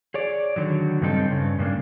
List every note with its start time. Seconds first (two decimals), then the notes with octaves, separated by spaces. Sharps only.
0.14 G#4 C#5 D5
0.56 D3 D#3 F#3
1.01 G2 C#3 G3 C4 D#4 A4
1.32 G2 C#3
1.59 G2 C#3 A#3 D4